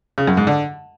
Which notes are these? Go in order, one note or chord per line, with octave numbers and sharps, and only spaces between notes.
C#3
F#2
G#2
D3